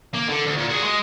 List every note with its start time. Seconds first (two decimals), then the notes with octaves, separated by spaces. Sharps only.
0.14 A#3
0.29 D3
0.46 D2
0.58 A#2
0.69 F#4 G#4
0.83 G#3